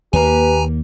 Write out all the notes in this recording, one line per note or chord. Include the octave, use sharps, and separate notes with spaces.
D#2 A#3 G4 B4 G#5 A#5